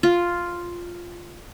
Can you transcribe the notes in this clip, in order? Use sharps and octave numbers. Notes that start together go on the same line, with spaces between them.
F4